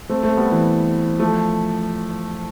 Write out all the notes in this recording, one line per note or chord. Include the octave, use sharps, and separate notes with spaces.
A3 C4
A3 C4
G3 B3
E3 G3
F3 A3